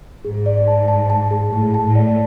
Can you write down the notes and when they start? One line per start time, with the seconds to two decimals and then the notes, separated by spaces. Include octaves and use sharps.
0.25 G#2 G#4
0.46 D5
0.68 A5
0.88 A5
1.10 A5
1.31 G#4
1.52 A2 G#4
1.74 A5
1.85 A2
1.95 D5